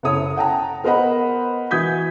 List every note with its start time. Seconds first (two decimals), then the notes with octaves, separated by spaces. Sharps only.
0.03 F#1 E4 A4 C#5 D#6
0.36 F#5 G5 A5 A#5
0.84 B3 A#4 C5 D#5 F#5 B5
1.71 E3 F#4 D#6 G6 G#6 B6